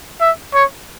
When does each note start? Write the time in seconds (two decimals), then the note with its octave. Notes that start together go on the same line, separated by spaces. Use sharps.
0.21 E5
0.54 C#5